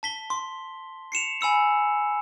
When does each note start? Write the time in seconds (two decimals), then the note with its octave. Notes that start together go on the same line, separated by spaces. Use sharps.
0.03 A5 B6 G7
0.30 C6
1.12 C7 C#7 E7 F7
1.41 G#5 B5 E6 C#7